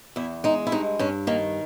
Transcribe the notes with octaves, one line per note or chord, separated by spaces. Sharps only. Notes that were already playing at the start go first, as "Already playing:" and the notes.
E2 E4
G#3 D#4
E4
G2 D#4
G2 C#4
D#3 A#3